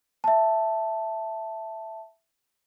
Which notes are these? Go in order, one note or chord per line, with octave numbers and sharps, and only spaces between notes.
E5 A5